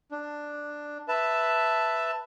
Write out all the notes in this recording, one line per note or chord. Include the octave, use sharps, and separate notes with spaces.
D4
B4 E5 A5